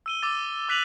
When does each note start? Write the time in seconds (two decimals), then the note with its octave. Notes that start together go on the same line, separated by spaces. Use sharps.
0.06 E6 D#7 G7
0.22 D6 E6 A6
0.69 D6 F#6 B6 D#7 F7 F#7